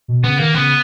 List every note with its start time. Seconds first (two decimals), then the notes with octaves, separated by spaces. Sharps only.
0.08 B2
0.23 C#3 B3
0.38 D#3 A#3
0.55 C#3 B3